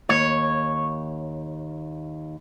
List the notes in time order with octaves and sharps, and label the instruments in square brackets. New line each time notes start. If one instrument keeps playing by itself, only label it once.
[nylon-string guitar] D#2 [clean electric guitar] C#5